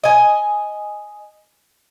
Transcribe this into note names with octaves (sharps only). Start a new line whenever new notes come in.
D#5 G#5